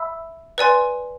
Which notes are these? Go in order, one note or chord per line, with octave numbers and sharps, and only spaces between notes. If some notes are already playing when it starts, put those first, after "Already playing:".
Already playing: E5 B5 E6
B4 D5 G#5 C6